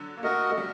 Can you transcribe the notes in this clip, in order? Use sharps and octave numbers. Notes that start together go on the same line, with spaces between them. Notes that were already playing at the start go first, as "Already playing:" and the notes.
Already playing: D3 F#3
A#3
A3 F#4 A#4 D#5
A3
G3